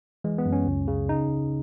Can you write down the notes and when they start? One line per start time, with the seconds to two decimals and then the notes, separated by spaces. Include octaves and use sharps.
0.24 E3 G#3
0.38 B3
0.46 F#2
0.53 C#4
0.67 C#2
0.88 C#3
1.09 D#4